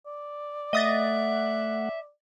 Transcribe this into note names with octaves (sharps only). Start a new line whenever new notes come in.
D5
A3 D#5 E5 F#5 D#6 A6